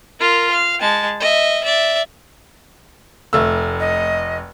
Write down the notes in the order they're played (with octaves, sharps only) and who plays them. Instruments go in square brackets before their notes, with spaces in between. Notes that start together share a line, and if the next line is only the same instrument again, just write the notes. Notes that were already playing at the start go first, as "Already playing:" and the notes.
[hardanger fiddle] F4 A#4
F5
G#3 A5
D#5 E5
D5 E5
[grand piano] F1 A3 E6
[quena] D#5